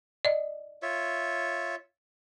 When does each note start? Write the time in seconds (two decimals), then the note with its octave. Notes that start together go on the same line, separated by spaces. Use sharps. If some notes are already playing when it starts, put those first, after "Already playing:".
0.25 D5 D#5
0.82 F4 C#5 E5